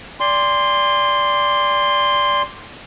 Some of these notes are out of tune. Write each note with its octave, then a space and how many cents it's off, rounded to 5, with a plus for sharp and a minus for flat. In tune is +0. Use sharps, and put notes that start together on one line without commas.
D5 -5 G5 +45 C6 +0